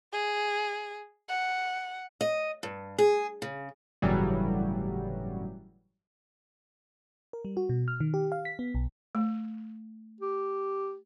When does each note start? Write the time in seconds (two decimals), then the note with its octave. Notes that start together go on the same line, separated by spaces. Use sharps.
0.13 G#4
1.29 F#5
2.21 D#5
2.63 G2
2.98 G#4
3.42 C#3
4.02 G1 A2 C#3 E3 F#3 G3
7.33 A#4
7.45 G3
7.57 F#4
7.69 B2
7.88 F6
8.00 D#3
8.14 G4
8.32 F5
8.45 B6
8.59 B3
8.75 B1
9.15 A3
10.21 G4